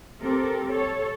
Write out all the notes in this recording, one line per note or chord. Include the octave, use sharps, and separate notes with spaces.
C4 G4 A4 A#4
A4 C#5